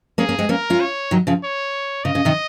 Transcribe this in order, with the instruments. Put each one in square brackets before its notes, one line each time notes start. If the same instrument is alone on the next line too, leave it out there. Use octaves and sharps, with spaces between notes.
[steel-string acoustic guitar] A#3 C#4 [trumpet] G#4
[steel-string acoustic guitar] A#3 C#4
G#3 C4
[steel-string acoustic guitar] A#3 C#4 [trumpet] A#4
[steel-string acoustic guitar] C#4 F4
[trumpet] C#5
[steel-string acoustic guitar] D#3 F#3
C#3 F3
[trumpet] C#5
[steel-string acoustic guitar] C#3 [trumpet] D#5
[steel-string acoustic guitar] C#3
C3 D#3